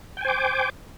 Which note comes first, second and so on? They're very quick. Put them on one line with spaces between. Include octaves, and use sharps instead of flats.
G5 G#5 C5 D6